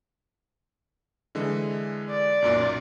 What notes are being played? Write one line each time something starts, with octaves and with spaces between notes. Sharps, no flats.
D3 E3 G#3
D5
B1 F#2 A#2